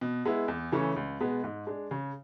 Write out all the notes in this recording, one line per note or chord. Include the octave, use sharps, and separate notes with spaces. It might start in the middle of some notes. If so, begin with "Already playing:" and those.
B2
G#3 B3 E4
E2
C#3 E3 A3 C#4
C#2
B2 G#3 B3
G#2
G#3 D4
C#3